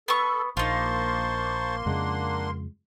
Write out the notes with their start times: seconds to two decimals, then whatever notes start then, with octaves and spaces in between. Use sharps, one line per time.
0.08 B3 A4 C#6
0.57 A#1 A#3 D#4 F4 C5 A5 C6 C#6
1.86 F2 C#3 G#3 D4 F#5